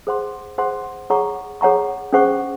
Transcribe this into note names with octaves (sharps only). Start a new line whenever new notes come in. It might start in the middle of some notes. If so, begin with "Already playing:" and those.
G#4 C5 F#5 C6
G#4 C5 F#5 C6
G#4 C#5 F#5 A#5 C#6
G#4 C#5 F#5 A#5 C#6
C#4 G#4 C5 F#5 C#6